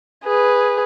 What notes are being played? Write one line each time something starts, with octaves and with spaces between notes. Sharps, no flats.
G#4 B4